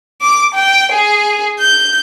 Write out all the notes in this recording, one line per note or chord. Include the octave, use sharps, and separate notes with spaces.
D6
G5
G#4
G6